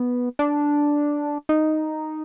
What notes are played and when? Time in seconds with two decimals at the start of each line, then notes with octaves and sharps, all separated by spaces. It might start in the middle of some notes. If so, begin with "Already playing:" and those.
Already playing: B3
0.39 D4
1.49 D#4